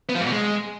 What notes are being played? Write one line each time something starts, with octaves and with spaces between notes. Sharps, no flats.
B3
F3
G#2
B2
G#3